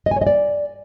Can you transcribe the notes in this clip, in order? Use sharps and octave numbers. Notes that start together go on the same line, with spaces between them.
D#5
G#5
C#5
D#5
D5